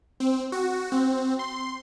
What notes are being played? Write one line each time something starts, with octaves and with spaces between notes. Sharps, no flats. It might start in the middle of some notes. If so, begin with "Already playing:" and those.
C4
F#4
C4
C6